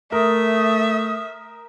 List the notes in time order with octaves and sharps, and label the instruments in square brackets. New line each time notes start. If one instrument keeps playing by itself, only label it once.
[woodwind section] A3 [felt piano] A#4 [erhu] E5 [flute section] D#6